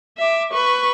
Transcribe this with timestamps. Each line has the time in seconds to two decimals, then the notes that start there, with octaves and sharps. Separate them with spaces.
0.18 E5 D6
0.52 B4 C#6